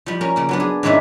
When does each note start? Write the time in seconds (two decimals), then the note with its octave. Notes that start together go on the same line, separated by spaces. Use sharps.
0.06 F3 G3
0.21 C#4 A#4
0.36 C#3 A#3
0.49 F#3 B3 D4
0.60 G#4
0.83 G#2 D#3 E3 C#4 D4 E4